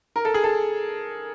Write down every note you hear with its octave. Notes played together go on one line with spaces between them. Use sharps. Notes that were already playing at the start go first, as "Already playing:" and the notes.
A#4
A4
G#4
A4